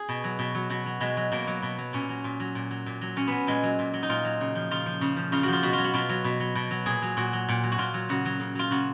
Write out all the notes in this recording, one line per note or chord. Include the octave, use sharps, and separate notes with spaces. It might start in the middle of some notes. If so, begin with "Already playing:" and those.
Already playing: G#4
B2
F#3
B2
F#3
B2 F#4
F#3
B2 G#3
F#3
B2 A#3
F#3
B2
F#3
A#2 C#4
F#3
A#2
F#3
A#2
F#3
A#2
F#3
A#2 C#4
F#3 B3
A#2 G#3
F#3
A#2
F#3
D#4
A#2 F4
F#3
C#3
F3
C#3 F4
F3
C#3
F3
C#3 F4
F3 F#4
F4
B2 F#4
F#3 F4
F#4
B2 F4
F#3
B2
F#3
B2
F#3
A#2 G#4
F#3
A#2 F#4
F#3
A#2
F#3
F#4
A#2 F4
F#3
C#3 F#4
F#3
C#3
F#3 F4
C#3 F#4